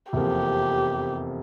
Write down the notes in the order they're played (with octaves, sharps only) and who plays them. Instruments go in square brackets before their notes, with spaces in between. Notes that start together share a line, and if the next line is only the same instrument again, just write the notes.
[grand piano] F1 E2 C3 F3 A#3 [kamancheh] G4